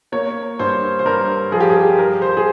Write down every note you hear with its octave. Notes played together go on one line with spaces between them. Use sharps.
A#3 C#5
G2 C5
C5
G2 A#4
F3 G#4
G4
G#4
G3 A#4
C5
G#4